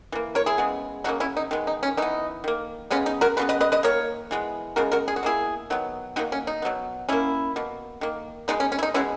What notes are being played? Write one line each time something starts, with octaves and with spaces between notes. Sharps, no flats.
E3 A#3
A#4 C#5
E4 G#4
C#3 G#3 B3
C#3 F#3 A#3 D#4 F#4
C#4 E4
D#4
D#3 G#3 B3
D#4
C#4
E3 B3 D#4
D#3 A#3
C#3 G#3 B3 C#4
D#4
F#4 A#4
C#3 F#3 B3 B4
B4 D#5
B4 D#5
B4 D#5
D#3 A#3 A#4 C#5
E3 G#3 B3
C#3 G#3 B3 F#4 A#4
F#4 A#4
G#4
F#4
B2 A#3 E4 G#4
D#3 F#3 B3
D#3 F#3 A#3 D#4 F#4
C#4
D#4
B2 F#3 B3
B2 A#3 C#4 E4
B2 A#3
D#3 A#3
B2 G#3 B3 D#4
C#4
C#4
E4
D#4
B2 G#3 B3 C#4 E4